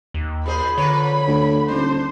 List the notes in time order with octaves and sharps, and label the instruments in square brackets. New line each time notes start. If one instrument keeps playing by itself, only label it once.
[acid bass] D#2
[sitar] A#2 G#4 C5 [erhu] B5
[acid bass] D3 [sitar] F3 B4 C#5
[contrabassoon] D2
[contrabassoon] D#1 [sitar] D4 [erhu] C5